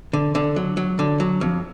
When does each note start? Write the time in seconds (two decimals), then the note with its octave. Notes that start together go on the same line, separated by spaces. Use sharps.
0.13 D3
0.35 D3
0.56 F#3
0.77 F#3
0.99 D3
1.20 F#3
1.41 F2